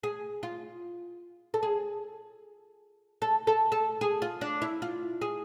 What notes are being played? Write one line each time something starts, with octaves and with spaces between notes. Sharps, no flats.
G#4
F4
A4
G#4
A4
A4
A4
G#4
F4
D4
E4
F4
G#4